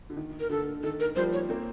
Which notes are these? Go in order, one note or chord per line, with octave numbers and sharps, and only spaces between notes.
D3
D#3
A#4
D3 A4
D#3 A4
A#4
F3 G3 C5
C#5
A#3 C4